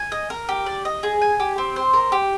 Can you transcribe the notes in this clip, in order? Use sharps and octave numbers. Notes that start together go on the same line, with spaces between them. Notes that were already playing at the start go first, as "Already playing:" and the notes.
Already playing: G#5
D#5
A#4
G4
D5
D#5
G#4
G#5
G4
C4
C5
A#4
G4